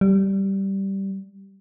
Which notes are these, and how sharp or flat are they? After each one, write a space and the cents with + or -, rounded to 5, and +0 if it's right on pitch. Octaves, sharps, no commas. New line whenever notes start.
G3 -10